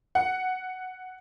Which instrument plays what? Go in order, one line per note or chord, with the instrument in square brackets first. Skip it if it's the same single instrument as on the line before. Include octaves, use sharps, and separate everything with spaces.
[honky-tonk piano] F#5